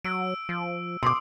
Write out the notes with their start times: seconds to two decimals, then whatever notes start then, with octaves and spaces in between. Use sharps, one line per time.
0.05 F#3 E6 D7
0.49 F3
1.03 B2 C6 D6 D#6